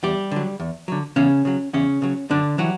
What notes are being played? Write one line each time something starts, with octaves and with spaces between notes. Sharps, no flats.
E2 G3 G4
D3 F#3
E2
D3 F#3
E2 C#3 C#4
C#3 F#3
E2 C#3 C#4
C#3 F#3
F#2 D3 D4
E3 F#3 G3 F#4